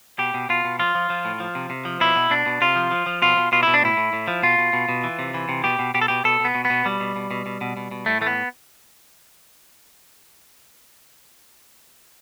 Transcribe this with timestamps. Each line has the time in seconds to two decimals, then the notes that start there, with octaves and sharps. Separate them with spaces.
0.19 B2 G4
0.34 B2
0.49 B2 F4
0.65 B2
0.79 F3 F4
0.95 F3
1.10 F3
1.25 A2
1.40 F3
1.55 C3
1.70 C3
1.85 F3
2.00 B2 E4
2.16 B2
2.30 B2 D4
2.46 B2
2.61 C3 F4
2.76 F3
2.91 F3
3.06 F3
3.22 B2 F4
3.37 B2
3.52 B2 F4
3.63 B2 E4
3.74 D4
3.82 A2 E4
3.97 A2
4.13 A2
4.28 F3
4.43 B2 F4
4.58 B2
4.73 B2
4.89 B2
5.04 E3
5.19 C3
5.34 E3
5.49 C3
5.64 B2 G4
5.79 B2
5.94 B2 G4
6.01 A4
6.08 B2 G4
6.24 B2 A4
6.40 B2 B3
6.55 B2
6.65 B3
6.70 B2
6.85 B2 G3
7.00 B2
7.16 B2
7.31 B2
7.46 B2
7.61 B2
7.77 B2
7.91 B2
8.06 A2 A3
8.21 E3 A3
8.27 B3